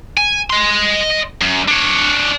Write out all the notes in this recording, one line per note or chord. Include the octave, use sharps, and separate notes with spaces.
G#5
D#5 C6
F#2
D4 C#5